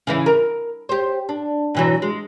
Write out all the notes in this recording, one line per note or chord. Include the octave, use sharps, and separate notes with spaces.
C#3 E3 E4
A#4
G4 C5
D4
B2 E3 F#3
G#3